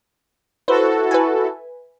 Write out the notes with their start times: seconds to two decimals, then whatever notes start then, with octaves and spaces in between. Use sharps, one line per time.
0.68 E4 F#4 A4 B4 C5
1.11 B4 E5 G#5